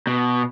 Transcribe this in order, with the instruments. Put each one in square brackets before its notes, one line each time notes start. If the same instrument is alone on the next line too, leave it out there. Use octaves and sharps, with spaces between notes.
[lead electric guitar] B2